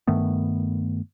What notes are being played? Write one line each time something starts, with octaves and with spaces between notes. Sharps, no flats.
G2 D#3 A3 B3